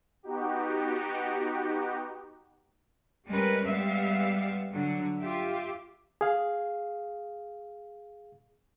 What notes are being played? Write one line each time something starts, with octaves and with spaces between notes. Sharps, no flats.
B3 D#4 F#4 G4
G3 G#3 C#4 A#4 B4
G3 G#3 B3 E5 F5
D3 F#3
F4 G4 E5
G#4 F5